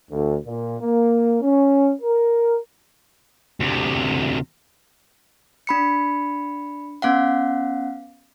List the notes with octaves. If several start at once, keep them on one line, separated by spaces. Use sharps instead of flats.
D2
A#2
A#3
C#4
A#4
D2 C3
D4 B5 C#7
B3 C#4 F5 F#5